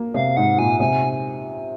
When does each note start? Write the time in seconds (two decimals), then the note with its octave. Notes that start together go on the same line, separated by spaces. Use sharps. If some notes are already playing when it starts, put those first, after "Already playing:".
Already playing: A#3
0.14 C3 F5
0.37 G#2 F#5
0.58 A#2 G#5
0.80 C3 G#5